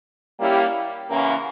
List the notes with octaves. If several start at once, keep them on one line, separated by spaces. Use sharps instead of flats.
G3 A#3 C#4 E4 G4
E2 C#3 E3 A#3 C#4